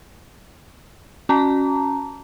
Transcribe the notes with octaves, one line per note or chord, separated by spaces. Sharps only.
C#4 F#4 A5 A#5